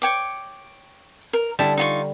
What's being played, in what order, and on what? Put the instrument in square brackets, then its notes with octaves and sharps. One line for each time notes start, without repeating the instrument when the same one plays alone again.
[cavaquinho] C#5 G5 D6
A#4
[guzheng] D3 G3 [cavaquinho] E4 A5 D#6
[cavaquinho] D#4 F4 C#6